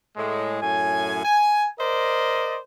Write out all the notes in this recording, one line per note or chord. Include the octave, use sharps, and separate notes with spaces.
A2 G#3
F#2 A2 G#5
G#5
A#4 C5 D5 D#5